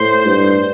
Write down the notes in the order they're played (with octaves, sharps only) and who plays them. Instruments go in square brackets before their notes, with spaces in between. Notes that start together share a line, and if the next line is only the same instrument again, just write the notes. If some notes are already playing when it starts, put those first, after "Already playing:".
Already playing: [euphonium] A2 [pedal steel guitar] C5
[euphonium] G2